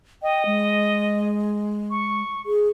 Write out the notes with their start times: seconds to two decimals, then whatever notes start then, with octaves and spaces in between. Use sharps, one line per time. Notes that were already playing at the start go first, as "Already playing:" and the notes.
0.22 D#5 G5
0.46 G#3
1.91 C#6
2.46 G#4